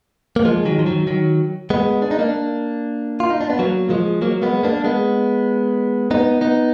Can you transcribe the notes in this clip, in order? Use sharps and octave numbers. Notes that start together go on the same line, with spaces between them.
A#3
F3 G#3
D#3 F#3
F3
D#3 F#3
D#3 F#3
G#3 B3
D4
D#4
A#3 D4
F4
D#4
D4
B3
F#3 A#3
F3 G#3
F#3 A#3
G#3 B3
A#3 D4
G#3 B3
B3 D#4
B3 D#4